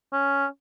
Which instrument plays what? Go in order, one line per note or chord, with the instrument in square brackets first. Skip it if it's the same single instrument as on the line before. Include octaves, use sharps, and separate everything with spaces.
[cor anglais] C#4